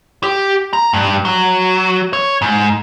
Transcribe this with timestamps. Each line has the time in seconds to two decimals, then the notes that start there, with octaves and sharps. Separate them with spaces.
0.23 G4
0.73 A#5
0.93 G2
1.25 F#3
2.13 C#5
2.42 G#2